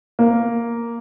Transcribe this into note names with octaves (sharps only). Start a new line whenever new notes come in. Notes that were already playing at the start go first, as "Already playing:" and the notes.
A#3